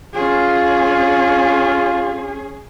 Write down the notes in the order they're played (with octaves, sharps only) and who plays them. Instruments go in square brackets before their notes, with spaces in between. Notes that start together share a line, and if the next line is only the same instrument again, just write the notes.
[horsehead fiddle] C#4 G#4 [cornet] F4